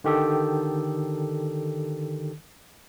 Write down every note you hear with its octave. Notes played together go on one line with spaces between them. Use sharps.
D3 D#3 G4 A4